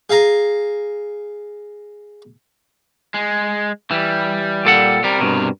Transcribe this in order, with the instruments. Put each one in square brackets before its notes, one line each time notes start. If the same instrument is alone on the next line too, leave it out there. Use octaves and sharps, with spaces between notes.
[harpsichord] G#4 F5 G#5 A#5
[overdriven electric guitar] G#3
[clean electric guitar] E3 [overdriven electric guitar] G3
[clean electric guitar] A#2 A4 F#5
[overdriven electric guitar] C3 A#4 [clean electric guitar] G3
[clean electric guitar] G2 B2